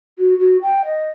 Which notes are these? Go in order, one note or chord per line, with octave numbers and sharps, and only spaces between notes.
F#4
F#4
G5
D#5